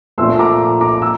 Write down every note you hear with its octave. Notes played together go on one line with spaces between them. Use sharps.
A#2 F3 A3 C6 E6
A#5 D6
A#5 D6
E6